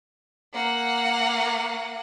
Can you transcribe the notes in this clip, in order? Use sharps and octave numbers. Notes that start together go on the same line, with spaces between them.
A#3 F#5